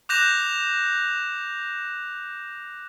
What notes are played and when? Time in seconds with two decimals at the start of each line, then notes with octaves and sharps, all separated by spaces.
0.09 D6 F#6 G6 A#6 E7 F7